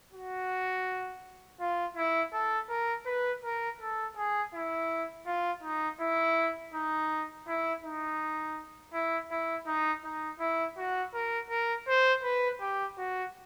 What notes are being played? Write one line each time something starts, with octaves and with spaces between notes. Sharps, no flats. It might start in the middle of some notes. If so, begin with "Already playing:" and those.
F#4
F4
E4
A4
A#4
B4
A#4
A4
G#4
E4
F4
D#4
E4
D#4
E4
D#4
E4
E4
D#4
D#4
E4
F#4
A#4
A#4
C5
B4
G4
F#4